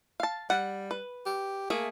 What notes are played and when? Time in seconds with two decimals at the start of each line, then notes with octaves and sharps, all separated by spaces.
0.20 F5 A5
0.50 G3 F#5
0.91 B4
1.26 G4
1.70 A3 A#3 G#4 E5